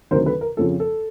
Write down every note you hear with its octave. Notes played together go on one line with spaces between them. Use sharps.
D2 C3 D#3 F#3 A#4 C5
A4 B4
A#4
F2 C#3 F3 A4
A4